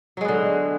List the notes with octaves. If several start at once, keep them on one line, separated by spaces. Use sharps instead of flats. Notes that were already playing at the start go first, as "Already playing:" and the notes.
D3 F#3 G#3 B3